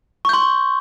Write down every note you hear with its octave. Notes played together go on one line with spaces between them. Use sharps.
C6 C#6 G6